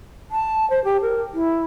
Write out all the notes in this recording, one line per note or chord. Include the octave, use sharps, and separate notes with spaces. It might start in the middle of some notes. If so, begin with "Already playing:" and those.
A5
C5
G4
A#4
E4